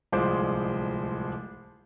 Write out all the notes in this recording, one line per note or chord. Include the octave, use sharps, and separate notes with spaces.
D1 C2 F3 G#3 C5 D6